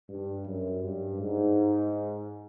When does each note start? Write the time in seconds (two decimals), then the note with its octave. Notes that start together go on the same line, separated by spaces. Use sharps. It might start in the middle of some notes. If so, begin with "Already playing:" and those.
0.09 G2
0.45 F#2
0.83 G2
1.19 G#2